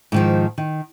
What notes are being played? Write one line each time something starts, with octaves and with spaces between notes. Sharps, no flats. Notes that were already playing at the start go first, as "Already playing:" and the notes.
G#2 D#3 F3
D#3